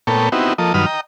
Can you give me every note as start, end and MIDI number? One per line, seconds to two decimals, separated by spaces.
0.07 0.29 46
0.07 0.29 57
0.07 0.29 59
0.07 0.29 69
0.07 0.29 73
0.07 0.29 79
0.32 0.53 59
0.32 0.53 60
0.32 0.53 63
0.32 0.53 64
0.32 0.53 66
0.32 0.53 67
0.58 0.73 53
0.58 0.73 58
0.58 0.73 69
0.58 0.73 75
0.74 0.86 43
0.74 0.86 51
0.74 0.86 54
0.74 0.86 71
0.74 0.86 87
0.74 0.86 89
0.86 1.01 75
0.86 1.01 79
0.86 1.01 82